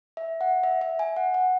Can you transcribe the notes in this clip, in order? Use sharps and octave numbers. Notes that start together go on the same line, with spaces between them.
E5
F#5
E5
E5
G#5
F#5
F#5